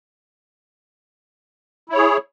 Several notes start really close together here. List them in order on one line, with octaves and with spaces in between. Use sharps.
E4 C#5 G#4